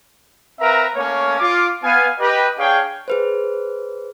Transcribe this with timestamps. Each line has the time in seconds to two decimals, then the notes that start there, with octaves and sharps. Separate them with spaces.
0.60 C4 A#4 B4 E5 F5 A#5
0.96 A3 A#3 C#4 C#5
1.40 F4 D6
1.84 B3 F5 G#5
2.20 G4 B4 D#5
2.59 D4 G#4 C#5 F5 G5
3.08 G#4 B4 C5